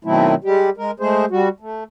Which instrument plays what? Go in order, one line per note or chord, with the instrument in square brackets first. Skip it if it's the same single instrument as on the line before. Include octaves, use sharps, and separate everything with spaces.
[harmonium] B2 D#3 F#3 A3 C4 E4
G3 G#3 G4
G#3 A#4
G#3 A3 G#4 C5
G3 F#4
A3